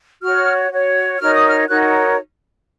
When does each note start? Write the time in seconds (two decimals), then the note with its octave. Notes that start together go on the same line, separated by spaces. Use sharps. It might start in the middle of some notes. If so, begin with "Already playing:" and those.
0.22 F#4 C#5 F6
0.71 F#4 C#5
1.20 D#4 F#4 A#4 C#5 F6
1.34 D#6
1.48 F6
1.68 D#4 F#4 A#4 C#5 F#6